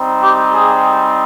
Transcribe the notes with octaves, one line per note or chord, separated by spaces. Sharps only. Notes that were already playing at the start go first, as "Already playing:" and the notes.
Already playing: G3 C4 D#4
G4
G#4